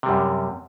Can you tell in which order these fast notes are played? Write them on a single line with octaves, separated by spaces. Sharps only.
C3 G3 F#2